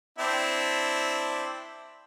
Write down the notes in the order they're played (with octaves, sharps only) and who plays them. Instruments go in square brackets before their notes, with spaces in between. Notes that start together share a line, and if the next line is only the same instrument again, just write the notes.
[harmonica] C4 D4 E4